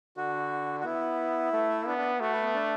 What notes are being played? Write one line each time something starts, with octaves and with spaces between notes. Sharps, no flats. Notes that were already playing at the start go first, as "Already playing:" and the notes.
D3 F#4
F#4
B3 E4
A3
B3 D4
D4
A3 F#4
B4
B3
D4